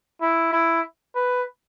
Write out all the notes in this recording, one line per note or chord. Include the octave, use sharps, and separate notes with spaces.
E4
E4
B4